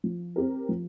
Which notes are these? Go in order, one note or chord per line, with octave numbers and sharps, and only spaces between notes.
F3
C4 G4 A#4
F3